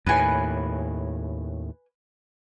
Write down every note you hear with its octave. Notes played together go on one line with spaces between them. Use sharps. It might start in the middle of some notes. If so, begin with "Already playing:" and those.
D#2 A2 B4 G#5